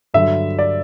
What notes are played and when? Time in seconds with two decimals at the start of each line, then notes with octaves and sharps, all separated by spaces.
0.14 G2 D3 F#3 E5
0.59 D5